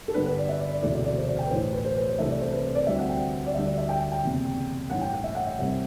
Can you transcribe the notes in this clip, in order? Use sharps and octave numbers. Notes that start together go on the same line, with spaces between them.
A4
G2 D3 G3 B3 D4 B4
B4
D5
E5
D5
D5
E1 D2 C3 E3 A3 D5
E5
D5
C5
D5
G5
B4
A1 A2 E3 C5
B4
C5
B4
C5
C2 C3 E3 A3 D4 E5
D5
C5
B4
C5
D5
D2 D3 G3 C4 E5
F#5
G5
D5
D2 D3 G3 D4 E5
D5
E5
G5
G5
G5
F#1 E2 C3
A1 G2 E3 F#5
G5
F#5
E5
F#5
E5
C2 C3 G3 C4 E5